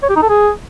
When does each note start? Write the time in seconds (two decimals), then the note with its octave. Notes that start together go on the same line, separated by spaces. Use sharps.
0.03 C#5
0.09 G4
0.16 D#4
0.22 A4
0.29 G#4